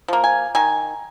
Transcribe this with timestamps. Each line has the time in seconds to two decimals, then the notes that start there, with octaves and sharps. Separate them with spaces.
0.08 F3 A#3
0.24 G#5
0.55 D#3 G#5